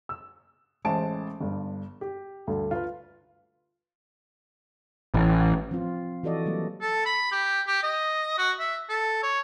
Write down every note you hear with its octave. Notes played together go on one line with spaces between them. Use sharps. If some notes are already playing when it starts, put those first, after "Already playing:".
E6
A1 G#3 C5 A5 D7
G1 G2
G4
D2 G2 D3
F4 B4
A1
F3 C4 F4
E3 F#4 A4 D5 D#5
F#3 G3 A#3
A4
B5
G4
G4
D#5
F#4
E5
A4
C#5